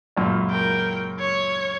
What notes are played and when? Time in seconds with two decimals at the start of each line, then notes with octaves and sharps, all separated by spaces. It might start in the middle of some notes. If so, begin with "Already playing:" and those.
0.17 C#2 F#2 A#2
0.50 A#4 G5
1.20 C#5